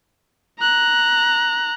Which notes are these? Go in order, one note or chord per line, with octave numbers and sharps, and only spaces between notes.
A#5 F#6